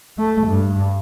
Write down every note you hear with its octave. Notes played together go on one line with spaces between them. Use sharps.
A3
G2